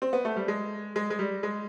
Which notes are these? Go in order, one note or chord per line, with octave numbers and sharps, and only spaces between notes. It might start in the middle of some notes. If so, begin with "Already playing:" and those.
C4
B3
A3
G3
G#3
G#3
G#3
G3
G#3